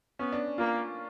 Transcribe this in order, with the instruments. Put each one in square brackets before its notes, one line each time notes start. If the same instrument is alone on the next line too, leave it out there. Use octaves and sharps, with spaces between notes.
[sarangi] B3 [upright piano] C#4
[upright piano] D4
[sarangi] A#3 [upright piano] F4